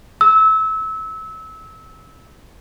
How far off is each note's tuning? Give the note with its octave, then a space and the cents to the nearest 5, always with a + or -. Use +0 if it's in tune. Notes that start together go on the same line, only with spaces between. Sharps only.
E6 -25